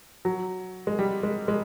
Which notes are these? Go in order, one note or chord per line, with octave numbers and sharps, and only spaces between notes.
F#3
G#3
G3
G#3
G#3